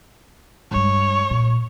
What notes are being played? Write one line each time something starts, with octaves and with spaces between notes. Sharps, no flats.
G2 G#3 C#5
A#2